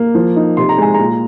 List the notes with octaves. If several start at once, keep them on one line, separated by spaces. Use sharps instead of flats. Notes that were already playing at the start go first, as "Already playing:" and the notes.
Already playing: A#3
F3
D#4
C3 C6
A#5
G#3 G#5
A#2 A#5